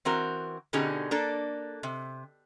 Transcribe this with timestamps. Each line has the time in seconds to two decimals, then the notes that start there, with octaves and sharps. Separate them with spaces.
0.05 E3 C4 F#4 A#4
0.73 B2 D3 C#4 D#4 G4 G#4
1.11 A#3 D4 A4
1.83 C3